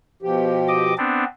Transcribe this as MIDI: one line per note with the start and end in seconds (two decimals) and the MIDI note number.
0.22 0.93 47
0.22 0.93 53
0.22 0.93 67
0.68 0.94 75
0.68 0.94 86
0.98 1.25 59
0.98 1.25 60
0.98 1.25 62